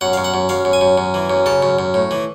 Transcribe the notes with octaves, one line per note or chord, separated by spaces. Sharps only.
F#2 F#5
F#2 F5
F#5
F#2
F#2 F5
F#2
G#5
F#2
F#2
E3
F#2
C#3 A5
F#2
F#2
A2
E3